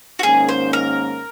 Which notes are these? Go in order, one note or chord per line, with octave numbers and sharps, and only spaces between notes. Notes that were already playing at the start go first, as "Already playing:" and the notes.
F#4
G#2 D#3 A#3 C#4 G#4
C5
A#4